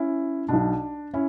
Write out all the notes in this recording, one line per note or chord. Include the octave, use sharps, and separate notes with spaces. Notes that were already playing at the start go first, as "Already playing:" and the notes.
Already playing: C#4 E4
B1 B2 D4
C#4 E4